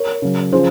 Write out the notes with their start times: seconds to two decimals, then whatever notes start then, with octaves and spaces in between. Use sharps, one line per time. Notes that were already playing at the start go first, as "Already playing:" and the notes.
Already playing: A#4 C#5
0.22 C#3 F#3
0.52 C#3 F3 G#4 C5